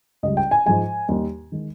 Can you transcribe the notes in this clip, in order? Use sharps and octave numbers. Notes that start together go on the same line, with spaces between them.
C#2 C#3 G3 D#5
G5
G#5
G#2 F3 G#3 G#5
D#2 D#3 G3
D#3 G#3